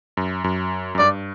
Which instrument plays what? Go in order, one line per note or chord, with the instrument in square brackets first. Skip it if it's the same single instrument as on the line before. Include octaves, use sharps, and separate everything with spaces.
[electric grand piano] F#2
F#2
F#2
[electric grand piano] G2 [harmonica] D5